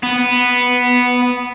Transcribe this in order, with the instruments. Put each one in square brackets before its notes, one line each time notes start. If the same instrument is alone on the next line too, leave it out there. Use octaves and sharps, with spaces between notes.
[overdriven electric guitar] B3